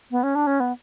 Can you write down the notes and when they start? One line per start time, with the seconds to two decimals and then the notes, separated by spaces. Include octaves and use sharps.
0.11 B3
0.23 C#4
0.35 D4
0.47 C#4
0.60 B3